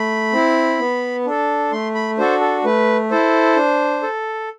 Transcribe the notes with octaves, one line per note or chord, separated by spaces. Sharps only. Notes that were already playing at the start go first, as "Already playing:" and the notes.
Already playing: A3 B5
C4 E4
B3
D4 A4
A3 C6
B5
D4 F#4 A4 C5
A4
A3 B4
E4 A4 C5
D4
A4